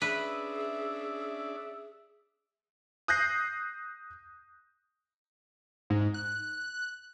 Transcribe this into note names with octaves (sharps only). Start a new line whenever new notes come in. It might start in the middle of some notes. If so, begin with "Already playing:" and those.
C#4 D4 G#4 B4 D5 E5
D#6 F#6 G6 A#6 C7
G#2
F#6